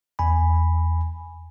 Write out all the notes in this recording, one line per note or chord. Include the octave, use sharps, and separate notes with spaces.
E2 G#5 B5